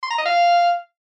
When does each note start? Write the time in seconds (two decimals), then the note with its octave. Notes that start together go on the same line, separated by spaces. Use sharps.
0.03 C6
0.11 A#5
0.18 D#5
0.26 F5